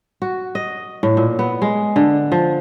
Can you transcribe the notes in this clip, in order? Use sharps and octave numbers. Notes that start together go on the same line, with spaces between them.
F#4
D#5
A2
A#2
B3
G#3
D3
F3